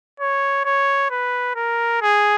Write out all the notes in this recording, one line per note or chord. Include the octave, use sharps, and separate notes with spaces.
C#5
C#5
B4
A#4
G#4